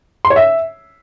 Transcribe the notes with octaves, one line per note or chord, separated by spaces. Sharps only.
C6
C#5
E5